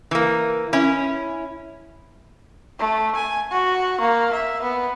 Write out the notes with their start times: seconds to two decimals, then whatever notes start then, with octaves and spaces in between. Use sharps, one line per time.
0.11 E3 A#3
0.73 C#4 E4
2.79 A3
3.16 G#5
3.51 F#4
4.01 A#3
4.33 E5
4.62 B3